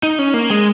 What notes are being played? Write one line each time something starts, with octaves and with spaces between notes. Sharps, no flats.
D#4
C#4
A#3
G#3